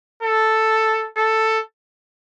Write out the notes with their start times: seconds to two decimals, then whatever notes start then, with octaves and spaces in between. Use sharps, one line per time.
0.23 A4
1.17 A4